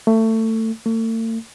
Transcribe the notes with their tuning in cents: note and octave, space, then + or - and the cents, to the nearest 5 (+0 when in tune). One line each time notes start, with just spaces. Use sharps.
A3 +25
A3 +45